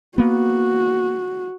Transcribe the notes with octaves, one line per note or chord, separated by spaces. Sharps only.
A#3 B3 F#4